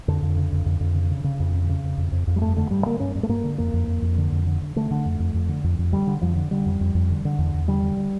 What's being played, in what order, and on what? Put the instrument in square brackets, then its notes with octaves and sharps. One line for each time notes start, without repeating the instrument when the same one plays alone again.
[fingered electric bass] F2 D3
F2
C#3
F2
F2
F2
C#3
C#3
C#3
F2
C#3
C#3
F2
F2
F2
F2
G3
G2 A3
D3 A3
G2 G3
D3 A#3
G2 C#4
G2
A3
G2 A#3
D3
F2 A#3
F2
F2
F2
D3
F2
D3
D3
D3 A3
D3
F2
F2
F2
D3
F2
F2
D3 G3
D3
F2 F3
D3
D3 G3
F2
F2
F2
D3
D3
E2
E2
D3 G3
D3
D3